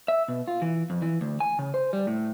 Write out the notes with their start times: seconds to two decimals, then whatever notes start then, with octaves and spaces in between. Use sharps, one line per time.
0.08 E5
0.28 B2
0.48 F4
0.62 E3
0.90 F2
1.02 E3
1.21 D2
1.40 G#5
1.59 C#3
1.74 C5
1.93 G3
2.07 A2